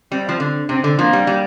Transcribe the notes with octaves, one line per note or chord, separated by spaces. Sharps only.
G3 C4
F3
D3
C3 C4
D3
F3 A#3
G3
G3